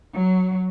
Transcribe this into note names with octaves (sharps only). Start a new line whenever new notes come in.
F#3